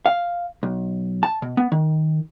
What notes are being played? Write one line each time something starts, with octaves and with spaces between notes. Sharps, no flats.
F5
B1
A5
B2
B3
D#3